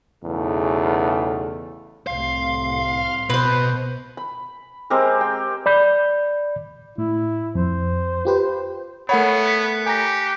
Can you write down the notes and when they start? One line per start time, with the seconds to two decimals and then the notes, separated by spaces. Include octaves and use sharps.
0.24 B1 E2 C#3 A3
2.07 C2 A2 C3 F5 C6
3.30 B2 B4 C5
4.17 B5
4.90 G#3 C4 G4 A#4
5.21 G5
5.66 D5 B5 G6
6.98 A2 E4
7.55 F2 C5
8.25 F4 G4 B4
9.09 A3 B3 A#4 C#5 F#5 B5
9.46 F#6 B6 C#7
9.86 G4 G#5 A#5 A#6